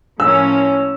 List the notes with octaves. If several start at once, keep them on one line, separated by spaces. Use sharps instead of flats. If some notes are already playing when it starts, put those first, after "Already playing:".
A2 F3 A#3 C#4 E6